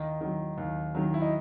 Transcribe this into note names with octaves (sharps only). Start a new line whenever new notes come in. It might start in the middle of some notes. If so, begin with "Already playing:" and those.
Already playing: D#2 D#3 D#4
D#3 F#3
D#2
D#3 F#3
E4
D#4